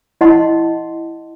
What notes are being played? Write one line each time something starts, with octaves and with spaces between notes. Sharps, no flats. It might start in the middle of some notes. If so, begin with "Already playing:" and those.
E4 D#5 F#5 A5 C6